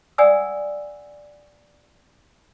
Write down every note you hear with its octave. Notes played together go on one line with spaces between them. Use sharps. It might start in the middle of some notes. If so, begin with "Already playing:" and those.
D5 F#5 G#5 D#6 E6